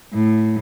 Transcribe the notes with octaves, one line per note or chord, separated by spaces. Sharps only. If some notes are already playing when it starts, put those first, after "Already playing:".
A2